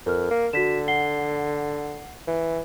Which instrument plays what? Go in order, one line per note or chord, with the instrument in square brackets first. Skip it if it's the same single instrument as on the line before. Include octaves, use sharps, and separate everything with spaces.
[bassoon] F2 [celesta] A#4 F6
[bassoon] A#3
[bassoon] D3 [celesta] F#4 B6 E7
[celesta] F#5 C7 G7
[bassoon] E3